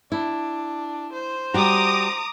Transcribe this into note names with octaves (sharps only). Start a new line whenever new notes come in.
D4 E4
C5
G3 F#4 A#5 D6 D#6